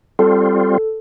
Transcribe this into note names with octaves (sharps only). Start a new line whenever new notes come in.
G3 C4 F4 A4